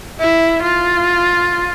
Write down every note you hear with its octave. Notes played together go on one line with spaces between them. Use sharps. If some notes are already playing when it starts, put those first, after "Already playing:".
E4
F4